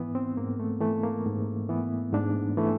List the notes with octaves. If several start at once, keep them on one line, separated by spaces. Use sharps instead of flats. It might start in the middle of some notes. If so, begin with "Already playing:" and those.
Already playing: G#2 E3 B3
C4
G#2 A#3
A3
E3 A3
A#3
G#2
E3 B3
G#2 D4
E3 A3